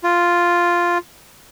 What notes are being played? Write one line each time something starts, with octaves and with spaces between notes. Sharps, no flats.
F4